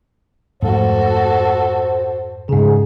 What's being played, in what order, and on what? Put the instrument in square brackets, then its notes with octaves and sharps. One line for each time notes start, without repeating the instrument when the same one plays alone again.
[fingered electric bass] F2 G#2 A3 [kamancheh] F#4 A4 [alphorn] C5
[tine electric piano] G#2 C#3 [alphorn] G#4